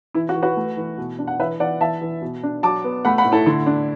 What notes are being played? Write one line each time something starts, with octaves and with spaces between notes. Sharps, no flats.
E3 E4
F#4
E3
F#4 B4
A3
E3
B2
D4
F#5
E3 B4 E5
E3 D5 F#5
E3 E5 A5
E3
B2
D4
F#3 A5 D6
B3
A3 F#5 B5
F#5 B5
A2
E4 A4
D3 E4
D4